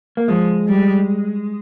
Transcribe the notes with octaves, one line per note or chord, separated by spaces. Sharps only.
A#3
F3 G#3
G3